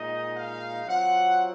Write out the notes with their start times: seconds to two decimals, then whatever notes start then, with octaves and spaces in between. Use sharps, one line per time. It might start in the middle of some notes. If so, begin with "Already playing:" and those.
Already playing: A#2 G#3 D#4 D#5
0.34 F5
0.85 F#3 C4 F4 F#5